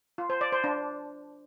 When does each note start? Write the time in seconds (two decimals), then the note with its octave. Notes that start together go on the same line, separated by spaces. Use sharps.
0.18 F4
0.30 C5
0.41 D5
0.52 C5
0.64 D4